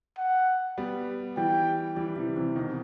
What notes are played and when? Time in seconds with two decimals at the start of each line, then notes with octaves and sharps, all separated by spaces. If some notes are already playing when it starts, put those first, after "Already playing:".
0.18 F#5
0.78 G3 B3
1.37 E3 G3 G5
1.96 E3 G3
2.16 C3 E3
2.36 C3 E3
2.56 B2 D#3